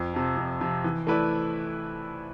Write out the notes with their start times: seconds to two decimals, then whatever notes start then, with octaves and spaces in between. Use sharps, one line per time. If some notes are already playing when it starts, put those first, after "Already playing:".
Already playing: F2
0.14 C3 F3
0.37 F2
0.61 C3 F3
0.84 E3
1.07 A3 E4 B4 D5